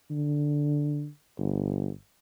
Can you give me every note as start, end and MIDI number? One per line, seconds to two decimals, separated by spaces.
0.11 1.07 50
1.39 1.90 31